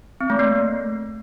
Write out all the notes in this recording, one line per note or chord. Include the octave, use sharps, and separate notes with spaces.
C4
A3
A#3